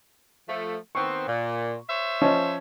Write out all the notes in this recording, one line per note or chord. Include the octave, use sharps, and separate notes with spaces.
F3 A3
D#3 B3 C4 C#6
A#2
C5 C#5 E5
F3 C#4 D#5